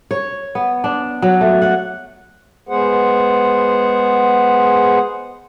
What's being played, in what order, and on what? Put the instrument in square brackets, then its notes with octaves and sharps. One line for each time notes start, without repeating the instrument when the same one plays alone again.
[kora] C#5
B3
D4
F#3
A3
F#5
[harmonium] G#3 B3 G#4 C5 F#5